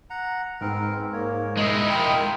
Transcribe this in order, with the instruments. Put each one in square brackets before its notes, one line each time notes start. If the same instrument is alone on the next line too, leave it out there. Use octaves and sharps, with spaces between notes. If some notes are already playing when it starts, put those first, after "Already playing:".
[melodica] F#5 A#5
[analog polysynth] G#2 [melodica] B3 C4 A#4
[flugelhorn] A#3 [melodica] C#5
[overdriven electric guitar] G#3 E4 [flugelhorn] D#5
[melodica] D#4 F4 D#5 [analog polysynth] A#4 B5 [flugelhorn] G5